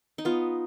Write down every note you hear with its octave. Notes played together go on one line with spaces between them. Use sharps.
D#4
B3 F4